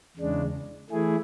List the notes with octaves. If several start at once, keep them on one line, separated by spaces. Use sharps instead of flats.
E2 C#3 G#3 D4
E3 A3 E4 G#4